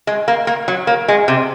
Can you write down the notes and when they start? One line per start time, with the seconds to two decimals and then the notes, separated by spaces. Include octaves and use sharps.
0.07 G#3
0.28 A#3
0.47 A#3
0.68 F#3
0.87 A#3
1.08 G#3
1.28 C3